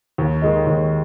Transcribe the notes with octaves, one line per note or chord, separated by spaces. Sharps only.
D#2
D#3 G#3 D#4
D#2